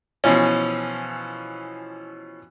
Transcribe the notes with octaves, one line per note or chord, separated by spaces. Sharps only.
B2 E3 F3 C#4